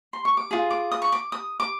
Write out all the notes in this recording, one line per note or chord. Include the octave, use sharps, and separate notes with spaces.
C6
C#6
D6
F4 G#4
D6
D#6
C#6
D6
D#6
D6